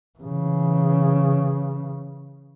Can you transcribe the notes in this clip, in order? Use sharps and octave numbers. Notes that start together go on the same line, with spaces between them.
C#3 E3